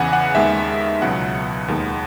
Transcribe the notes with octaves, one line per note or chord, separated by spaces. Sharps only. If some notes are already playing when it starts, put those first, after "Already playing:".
Already playing: E2 C#3 E3 B3 F#5 G#5
F#5
D#2 D#3 G#3 B3 E5
C#2 B2 F#3 B3 F#5
D#2 D#3 G#3 B3